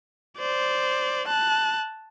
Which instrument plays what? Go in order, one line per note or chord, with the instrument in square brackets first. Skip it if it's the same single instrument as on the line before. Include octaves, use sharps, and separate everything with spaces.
[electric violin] C5 D5
A5 F#6